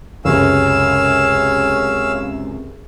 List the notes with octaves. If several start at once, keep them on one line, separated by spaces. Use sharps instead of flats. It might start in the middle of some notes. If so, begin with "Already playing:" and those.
C#2 F#2 C3 C#4 F5 E6